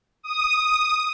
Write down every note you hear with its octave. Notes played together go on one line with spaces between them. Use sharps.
D#6